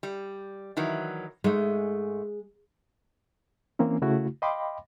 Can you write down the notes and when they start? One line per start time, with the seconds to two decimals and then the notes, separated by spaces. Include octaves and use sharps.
0.03 G3
0.77 D#3 E3 F#3
1.44 G#2 G#3 A3
3.79 E3 A#3 C4 C#4
4.02 C#3 A3 E4 F#4
4.42 D#5 F5 G5 B5 C6 D6